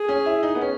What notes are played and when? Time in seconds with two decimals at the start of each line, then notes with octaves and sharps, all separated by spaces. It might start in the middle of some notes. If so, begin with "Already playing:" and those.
Already playing: G#4
0.08 C#4
0.26 E4
0.43 D#4
0.55 B3
0.61 C#4